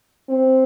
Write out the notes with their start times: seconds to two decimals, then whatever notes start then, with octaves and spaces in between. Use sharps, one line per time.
0.29 C4